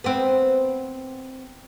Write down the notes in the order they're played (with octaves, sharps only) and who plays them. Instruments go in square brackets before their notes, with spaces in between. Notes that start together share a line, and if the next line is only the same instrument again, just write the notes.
[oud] B3 C4